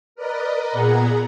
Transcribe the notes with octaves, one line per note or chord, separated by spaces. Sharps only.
A#4 B4 D5 D#5
A#2 B3 G#4 F#5 A#5 G#6